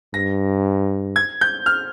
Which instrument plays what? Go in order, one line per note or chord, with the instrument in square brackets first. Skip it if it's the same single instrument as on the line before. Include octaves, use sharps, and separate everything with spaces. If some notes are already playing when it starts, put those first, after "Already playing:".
[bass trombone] G2 [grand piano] A#6
[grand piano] G#6
G6
F6